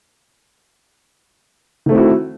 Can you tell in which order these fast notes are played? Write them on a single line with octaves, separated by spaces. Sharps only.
D#3 A3 C4 E4 F#4